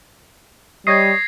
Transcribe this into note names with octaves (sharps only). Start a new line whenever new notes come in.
G3 C#5 D#5 D#6 G#6 A#6 C7